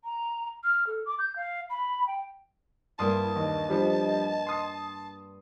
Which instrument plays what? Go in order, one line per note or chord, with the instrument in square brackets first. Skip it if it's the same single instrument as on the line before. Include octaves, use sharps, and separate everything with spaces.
[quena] A#5
F6
A4
D6
G6
F5
B5
G5
[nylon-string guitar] G2 A#3 [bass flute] E4 [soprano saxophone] A5 [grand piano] C6 D#6
[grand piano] D#2 [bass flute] D#5
[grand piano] F3 G3 D4
C6 D#6 C7